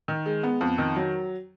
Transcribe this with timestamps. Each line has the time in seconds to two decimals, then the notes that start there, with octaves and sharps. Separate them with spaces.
0.08 D#3
0.26 G#3
0.43 B3
0.61 F2
0.78 D#3
0.96 F#3